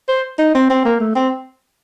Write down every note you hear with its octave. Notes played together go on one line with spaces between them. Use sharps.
C5
D#4
C4
C4
A#3
A3
C4